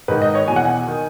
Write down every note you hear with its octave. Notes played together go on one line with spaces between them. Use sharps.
G#2 D#3 B4
D#5
C#5
E2 B2 G#5
F#5
G#5
D#3